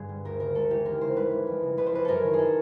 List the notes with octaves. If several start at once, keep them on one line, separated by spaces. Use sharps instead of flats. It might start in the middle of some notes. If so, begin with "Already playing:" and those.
Already playing: G2 D3 G#4
G3
D2 A#4
C#3 A#4
G#3 A4
E3 G4
D#2 A#4
C#3 C5
G3 B4
E3
F2
C#3
F2 B4
C5
E3 B4
F#2 A4 A#4
D#3
G#4
A4